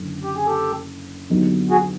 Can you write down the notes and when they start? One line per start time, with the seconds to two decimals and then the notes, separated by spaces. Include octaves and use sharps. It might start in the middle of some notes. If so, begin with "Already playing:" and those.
Already playing: F#1 D3
0.24 G4
0.36 G#4
0.47 G4 A4
1.30 D#2 D3 F#3 B3 D#4
1.70 F#4 G#4